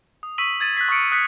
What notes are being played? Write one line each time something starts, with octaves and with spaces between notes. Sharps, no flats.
D#6
C#6 E6 B6 D#7 F#7
G#6 A6 D#7
F#6 B6
C#6 D#6 F6 F#6 C#7 D7
D#6 F#6 B6 C#7 D#7